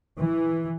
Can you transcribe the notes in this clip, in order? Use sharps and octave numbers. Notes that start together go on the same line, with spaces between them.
E3